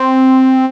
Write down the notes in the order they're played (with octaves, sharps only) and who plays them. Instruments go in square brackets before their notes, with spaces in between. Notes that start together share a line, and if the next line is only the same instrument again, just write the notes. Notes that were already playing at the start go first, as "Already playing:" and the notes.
Already playing: [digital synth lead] C4